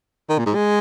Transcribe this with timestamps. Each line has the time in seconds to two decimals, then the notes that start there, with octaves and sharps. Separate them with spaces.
0.30 D#3
0.38 A#2
0.46 G#2
0.55 G#3